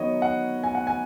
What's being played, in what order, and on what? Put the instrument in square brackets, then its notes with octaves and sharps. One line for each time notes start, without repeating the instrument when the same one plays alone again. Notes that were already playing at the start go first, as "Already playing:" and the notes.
Already playing: [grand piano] D#3 F#3 B3 D#4 C#5 D#5
F#5
G#5
F#5
G#5